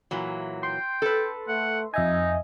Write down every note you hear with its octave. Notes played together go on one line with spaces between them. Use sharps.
A#2 E3 F#3
G5 C6
A4 B4
A3 F#5
F2 D#4 D#5 E5 G#5